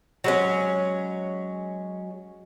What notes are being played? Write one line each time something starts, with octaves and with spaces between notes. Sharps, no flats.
F#3 G#3 C#4